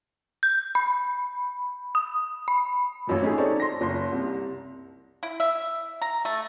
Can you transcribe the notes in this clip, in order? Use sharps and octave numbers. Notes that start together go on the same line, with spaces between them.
G6
B5
D#6
B5
A1 F#2 A#2
C#4 D#4 G4 G#4
C4 D#4 A4 C#5 D5
C6 A#6
F#1 C6
C2
E4
E5
A#5
A3